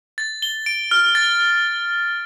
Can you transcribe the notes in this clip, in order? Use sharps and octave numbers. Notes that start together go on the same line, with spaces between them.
A6
G7
D7
F6
A6